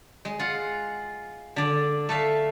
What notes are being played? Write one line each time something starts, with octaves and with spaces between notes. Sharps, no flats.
G#3
F4 F#5
D3 D5
A3 A4 E5 F5